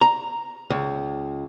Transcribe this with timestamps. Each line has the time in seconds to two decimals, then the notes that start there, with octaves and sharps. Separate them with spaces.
0.01 A#5
0.70 C#2